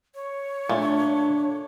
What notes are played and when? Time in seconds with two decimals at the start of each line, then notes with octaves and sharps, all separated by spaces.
0.15 C#5
0.69 A#2 A3 D4